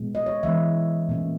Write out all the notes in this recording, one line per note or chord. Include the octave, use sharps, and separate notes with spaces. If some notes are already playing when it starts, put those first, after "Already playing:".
Already playing: A#2 G#3 B3
D#5
C#5
E3 G#3 B3 E5
A#2 A#3 C#4